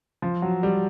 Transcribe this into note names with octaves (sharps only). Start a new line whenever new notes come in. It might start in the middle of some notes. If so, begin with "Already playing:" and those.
F3
F#3
G3